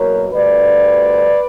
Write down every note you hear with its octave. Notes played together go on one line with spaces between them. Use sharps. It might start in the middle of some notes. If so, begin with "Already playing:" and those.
Already playing: E2 B2 F#3 A#3 A#4 C#5
D2 D3 G3 B4 D5